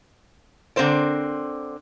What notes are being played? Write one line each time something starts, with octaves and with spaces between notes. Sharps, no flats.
D3 C4 A#4 C5 D5